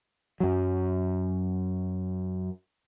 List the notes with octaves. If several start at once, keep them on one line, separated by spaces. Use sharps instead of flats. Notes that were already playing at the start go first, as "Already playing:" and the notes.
F#2 F#3